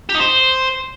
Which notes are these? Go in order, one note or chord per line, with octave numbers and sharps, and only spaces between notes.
G4
D#4
C5